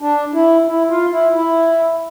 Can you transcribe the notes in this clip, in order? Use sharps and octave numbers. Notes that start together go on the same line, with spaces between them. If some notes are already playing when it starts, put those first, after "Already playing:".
D4
E4
E4
F4
E4
E4